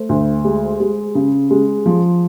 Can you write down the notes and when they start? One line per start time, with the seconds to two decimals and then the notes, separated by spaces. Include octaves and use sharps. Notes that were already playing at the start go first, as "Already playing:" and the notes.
Already playing: A3 C5
0.09 D2
0.45 G#3
0.80 G#3
1.15 C#3
1.51 G#3
1.86 F3